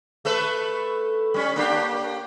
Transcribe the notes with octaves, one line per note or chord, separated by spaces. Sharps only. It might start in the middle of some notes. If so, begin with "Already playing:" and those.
A3 A4 B4
G3 C#4
A#3 D4 G4